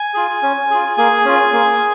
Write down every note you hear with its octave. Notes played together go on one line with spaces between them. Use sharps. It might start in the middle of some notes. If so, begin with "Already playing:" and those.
Already playing: G#5
F4 G#4
C#4
F4 G#4
A#3 G#4 G#5
C#4 F4
A#3